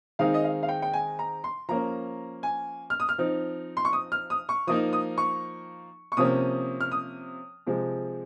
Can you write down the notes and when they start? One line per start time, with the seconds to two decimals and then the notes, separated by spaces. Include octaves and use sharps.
0.19 D#3 G#3 C4 D#4 F5
0.34 D#5
0.44 F5
0.63 F5
0.69 G5
0.82 G5
0.93 G#5
1.19 A#5
1.44 C6
1.68 F3 A#3 C#4 A#5
2.43 G#5
2.90 F6
3.00 D#6
3.09 F6
3.18 F3 C4 D#4
3.77 C6
3.85 C#6
3.93 D#6
4.12 F6
4.30 D#6
4.49 C#6
4.67 F3 A#3 D#4 D#6
4.93 D#6
5.18 C#6
6.12 C#6
6.17 C3 F3 A#3 C#4 D#6
6.81 F6
6.92 D#6
7.67 C3 F3 G#3